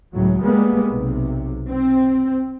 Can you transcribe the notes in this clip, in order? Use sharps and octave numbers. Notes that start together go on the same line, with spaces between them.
C#2 A2 F#3
G3 G#3 A#3 B3
B1 C3
C4